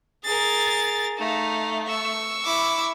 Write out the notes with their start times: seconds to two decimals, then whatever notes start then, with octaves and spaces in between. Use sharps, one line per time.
0.24 G#4 A#4 A6
1.18 A3 D#4 F5
1.87 C#6 E6
2.45 E4 D6